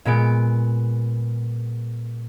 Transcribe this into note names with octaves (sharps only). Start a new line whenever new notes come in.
A#2 G#3 B3 D7